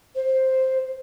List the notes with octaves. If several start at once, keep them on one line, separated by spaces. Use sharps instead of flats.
C5